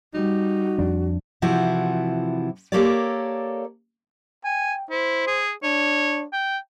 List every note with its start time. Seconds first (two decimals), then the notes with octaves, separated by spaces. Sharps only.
0.14 G3 D#4 F#4
0.79 F2 D4
1.42 C3 E3 F3 E4 F#4
2.72 A#3 G4 A4 A#4 C#5 D5
4.44 G5 G#5
4.90 E4 C5
5.27 G#4
5.63 D4 C#5
6.33 G5